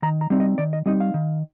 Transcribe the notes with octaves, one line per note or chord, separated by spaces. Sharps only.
D#3 A#5
A#5
G3 C4 D#4
D#5
D#3 D5
D#5
G3 C4 D#4 D#5
F5
D#3